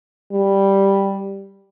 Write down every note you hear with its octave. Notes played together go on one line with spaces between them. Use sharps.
G3